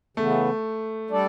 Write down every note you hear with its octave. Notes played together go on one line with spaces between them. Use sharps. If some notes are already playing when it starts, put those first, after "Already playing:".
C#3 E3 A3 B3
G3 D4 A4 D5